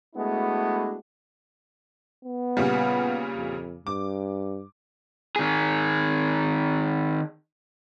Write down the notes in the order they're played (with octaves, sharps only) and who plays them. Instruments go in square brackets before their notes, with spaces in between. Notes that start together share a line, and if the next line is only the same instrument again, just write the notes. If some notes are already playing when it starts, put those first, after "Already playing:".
[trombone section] G#3 A3 B3 D4 E4 F#4
[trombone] B3
[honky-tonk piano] A#2 C#3 G3
[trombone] F2
[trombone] G2 [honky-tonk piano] D6
[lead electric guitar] D#3 G#4